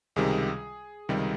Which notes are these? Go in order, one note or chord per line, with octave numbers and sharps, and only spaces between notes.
C#2 C3 D#3 G3 G#4
C#2 C3 D#3 G3